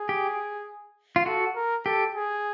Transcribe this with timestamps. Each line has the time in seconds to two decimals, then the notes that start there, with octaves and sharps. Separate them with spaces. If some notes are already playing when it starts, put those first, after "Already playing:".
Already playing: G#4
0.09 G4
1.16 F4
1.26 F#4 A4
1.55 A#4
1.86 G4 A4
2.15 G#4